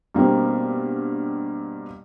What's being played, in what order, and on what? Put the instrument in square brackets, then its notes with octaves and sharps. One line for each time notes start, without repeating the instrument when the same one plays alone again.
[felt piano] G2 B2 A#3 C4